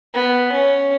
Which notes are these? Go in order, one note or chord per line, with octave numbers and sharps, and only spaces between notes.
B3
C#4